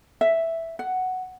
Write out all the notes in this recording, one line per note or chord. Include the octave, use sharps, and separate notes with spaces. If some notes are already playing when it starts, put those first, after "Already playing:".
E5
F#5